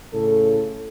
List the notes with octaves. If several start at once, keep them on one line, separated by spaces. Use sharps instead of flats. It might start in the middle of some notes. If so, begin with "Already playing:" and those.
A2 C#3 A4